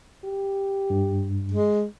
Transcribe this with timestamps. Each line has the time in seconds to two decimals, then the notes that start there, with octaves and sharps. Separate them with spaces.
0.24 G4
0.90 G2
1.52 G#3